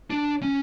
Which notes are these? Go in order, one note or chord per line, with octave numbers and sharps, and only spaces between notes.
D4
C#4